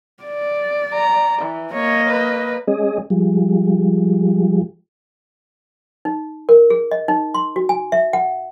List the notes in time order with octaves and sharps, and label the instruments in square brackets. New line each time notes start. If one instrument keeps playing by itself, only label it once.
[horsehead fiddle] D5
[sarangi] A#5
E3
[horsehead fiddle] A#3 D#5 [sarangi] C#5
[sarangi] B4
[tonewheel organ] G#3 C#4 G#4 D#5
F3 G3 G#3
[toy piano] D#4
A#4
G#4
D#5
D#4
C6
F#4
G#5
E5
F#5